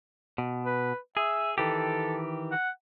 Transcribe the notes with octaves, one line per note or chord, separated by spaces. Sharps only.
B2
B4
G#4 E5
D#3 E3 G4 A4
F#5